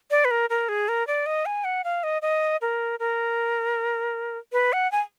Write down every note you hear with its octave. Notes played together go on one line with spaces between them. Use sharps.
D5
B4
A#4
A#4
G#4
A#4
D5
D#5
G#5
F#5
F5
D#5
D#5
A#4
A#4
B4
F#5
G#5